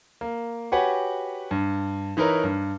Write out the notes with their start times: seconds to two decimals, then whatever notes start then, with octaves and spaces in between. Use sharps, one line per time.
0.21 A#3
0.72 F#4 G4 B4 C#5 F#5 G#5
1.51 G2
2.17 E3 D#4 E4 A#4 B4 C#5
2.44 G2